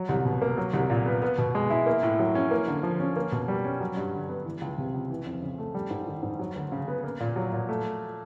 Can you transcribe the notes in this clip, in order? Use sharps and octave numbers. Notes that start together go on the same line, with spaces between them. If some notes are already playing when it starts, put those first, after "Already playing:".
Already playing: F#3
C2
B2
A#3
F#3
C2
A#2
B3
B3
B2
G#3
E4
A#3
A2
F#3
C#4
A#3
D3
F3
C#4
A#3
B2
G3
C#4
F#3
G2
D3
B3
E3
C#2
C3
C#2
E3
F2
C#3
A3
G3
G#2
D#3
G#2
F#3
D2
C#3
B3
A#3
A#2
F#3
A#2
A3